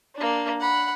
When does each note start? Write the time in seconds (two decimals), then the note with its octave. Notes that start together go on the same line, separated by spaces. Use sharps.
0.16 A#3 D4
0.61 F#5 B5